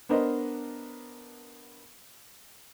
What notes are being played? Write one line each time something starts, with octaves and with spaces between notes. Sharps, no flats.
B3 D4 A#4 C5 D#5